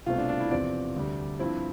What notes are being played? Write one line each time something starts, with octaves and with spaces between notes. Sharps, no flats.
C2 B2 A3 C4 F4
D4
D4
E4
E2 C3 F3 C4 D5
D2 D3 G3
G2 F3 C4 E4